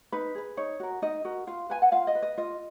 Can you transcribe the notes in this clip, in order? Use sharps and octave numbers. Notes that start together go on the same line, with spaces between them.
D#4 B4
G#4 B4
D#4 C#5
F#4 A#4
D#4 D#5
F#4 A#4
F4 F5
B4 G#5
F#5
F4 F5
D#5
B4
D#5
F4 D#5